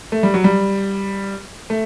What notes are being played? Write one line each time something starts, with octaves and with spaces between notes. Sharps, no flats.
A3
G3
F#3
G3
A3